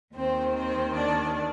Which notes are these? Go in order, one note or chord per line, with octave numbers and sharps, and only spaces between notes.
D#2 D#3 C4 C5
C4 C5
D4 D5